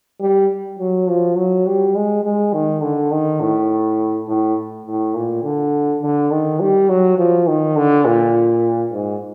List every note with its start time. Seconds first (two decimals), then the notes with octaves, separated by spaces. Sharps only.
0.21 G3
0.79 F#3
1.08 F3
1.37 F#3
1.66 G3
1.96 G#3
2.24 G#3
2.53 D#3
2.83 D3
3.12 D#3
3.41 A2
4.28 A2
4.86 A2
5.15 A#2
5.44 D3
6.02 D3
6.31 D#3
6.60 G3
6.89 F#3
7.18 F3
7.47 D#3
7.76 D3
8.06 A#2
8.93 G#2